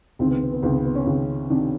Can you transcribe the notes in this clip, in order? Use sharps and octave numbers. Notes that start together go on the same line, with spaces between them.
C#2 C3 D#3 C4
B3
B3
B3
C#2 C3 D#3 B3
B3
B3
C#4
C#2 C3 D#3
C3 D#3 D4